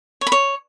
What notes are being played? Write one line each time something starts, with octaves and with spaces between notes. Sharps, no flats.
C#5
B5
C#5